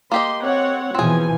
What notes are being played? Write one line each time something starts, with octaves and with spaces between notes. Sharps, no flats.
A#3 G4 D#5 C6
C4 C#5 F#5
B2 E3 F3 C4 G#4 G#5